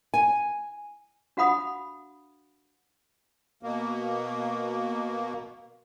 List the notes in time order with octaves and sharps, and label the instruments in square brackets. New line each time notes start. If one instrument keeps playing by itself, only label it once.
[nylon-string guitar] G#5
[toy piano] D4 F#4 F5 F#5 B5 D#6
[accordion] B2 A#3